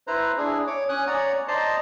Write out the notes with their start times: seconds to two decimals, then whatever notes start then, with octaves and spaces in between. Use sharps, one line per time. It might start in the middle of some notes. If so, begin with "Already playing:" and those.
0.07 E4 B4 C5 A#5
0.37 D4 E4 G#4
0.67 C#5 D6
0.89 C#4 G#5 D#6 F#6
1.07 C#5 D5 F#5 A#5
1.48 C5 D5 D#5 A5 A#5 C6